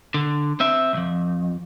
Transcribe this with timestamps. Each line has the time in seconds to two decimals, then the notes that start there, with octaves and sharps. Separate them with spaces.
0.14 D3
0.60 C4 E5
0.93 B1 F2